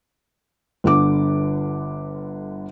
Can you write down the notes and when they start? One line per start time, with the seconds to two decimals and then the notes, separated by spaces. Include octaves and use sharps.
0.84 G1 D3 D6